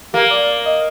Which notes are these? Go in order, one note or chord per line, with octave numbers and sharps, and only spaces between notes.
A#3 G4
D5
D#5